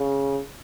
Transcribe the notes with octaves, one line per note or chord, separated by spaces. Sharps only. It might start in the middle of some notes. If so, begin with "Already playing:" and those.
Already playing: C#3